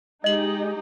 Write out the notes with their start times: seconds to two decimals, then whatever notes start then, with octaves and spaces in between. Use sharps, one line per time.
0.24 G#3 D#4 G4 D#5 F#7